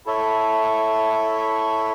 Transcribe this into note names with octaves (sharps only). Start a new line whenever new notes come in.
E4 A4 C#5 E5